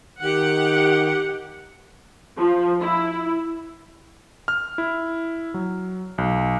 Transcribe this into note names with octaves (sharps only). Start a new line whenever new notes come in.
D#3 G4 F#5
F3
E4
F6
E4
F#3
B1